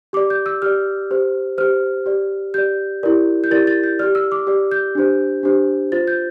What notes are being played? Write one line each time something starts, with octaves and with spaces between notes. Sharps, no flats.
G4 D5 D6
G6
E6
G4 D5 F6
G4 C5
G4 C5 F6
G4 D5
G4 D5 G6
E4 G4 A#4 D5
G6
E4 G4 A#4 D5 A6
A6
G6
G4 D5 F6
E6
D6
G4 D5
G6
D4 G4 C5
D4 G4 C5
F4 C5 A6
G6